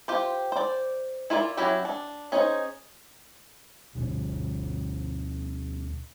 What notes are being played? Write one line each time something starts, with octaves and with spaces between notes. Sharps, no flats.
F4 G4 C5
C5 D5
E4 F4 A#4 D5
F#3 C#4 E4 G4 E5
D4
C#4 D#4 G#4 C5
D2 B2 D3